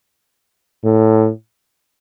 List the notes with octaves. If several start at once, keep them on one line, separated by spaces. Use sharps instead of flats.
A2